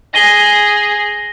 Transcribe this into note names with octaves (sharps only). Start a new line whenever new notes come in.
G#4 A#6 D#7 G7